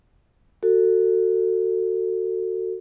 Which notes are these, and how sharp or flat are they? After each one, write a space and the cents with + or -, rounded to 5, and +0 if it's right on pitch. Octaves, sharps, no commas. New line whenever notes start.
F#4 +0 A4 +25